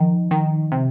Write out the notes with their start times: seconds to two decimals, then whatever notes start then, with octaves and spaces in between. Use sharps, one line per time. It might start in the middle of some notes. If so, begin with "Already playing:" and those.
Already playing: D#3 F3
0.31 D#3
0.72 C3